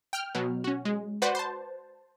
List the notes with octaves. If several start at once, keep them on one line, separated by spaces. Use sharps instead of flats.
G5 F6
B2 F#3
C#4 F#4
G#3
F#4 B4 C5 D5 F#5
C5 A5